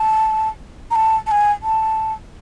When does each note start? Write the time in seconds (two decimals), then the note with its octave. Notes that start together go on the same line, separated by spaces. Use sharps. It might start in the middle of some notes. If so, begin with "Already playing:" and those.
Already playing: A5
0.91 A#5
0.95 A5
1.27 A5
1.31 G#5
1.63 A5